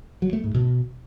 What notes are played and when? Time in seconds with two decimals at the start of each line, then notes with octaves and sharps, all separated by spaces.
0.22 F#3
0.33 A3
0.44 G#2
0.55 B2